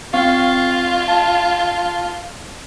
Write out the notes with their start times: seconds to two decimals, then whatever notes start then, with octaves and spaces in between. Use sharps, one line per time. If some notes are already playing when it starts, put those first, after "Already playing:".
0.14 C4 F4 F5 C#6
1.08 A5